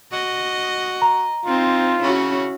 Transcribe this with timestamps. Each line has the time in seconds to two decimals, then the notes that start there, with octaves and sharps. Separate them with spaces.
0.13 F#4 D#5
1.02 A#5
1.46 C4 D#4 F4
2.03 C#3 C#4 E4 F#4